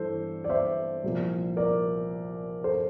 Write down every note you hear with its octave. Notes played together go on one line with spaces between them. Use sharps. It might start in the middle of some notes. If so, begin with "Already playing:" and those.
Already playing: G2 E3 A4 C5
D5
C5 E5
C2 A#2 F3
A#4 D5
A4 C5